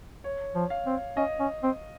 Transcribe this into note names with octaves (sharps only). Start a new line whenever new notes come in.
C#5
F3
F5
C4
C#4 D#5
C#4
C4